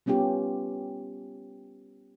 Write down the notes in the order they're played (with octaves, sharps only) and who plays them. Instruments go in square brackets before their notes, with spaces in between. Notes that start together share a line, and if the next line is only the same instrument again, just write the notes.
[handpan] G3 B3 C#4 F4 G4